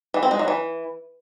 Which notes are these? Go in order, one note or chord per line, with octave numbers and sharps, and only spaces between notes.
E3
C4
G#3
F#3
E3